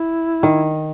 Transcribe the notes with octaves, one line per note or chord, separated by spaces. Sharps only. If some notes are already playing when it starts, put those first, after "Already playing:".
Already playing: E4
D#3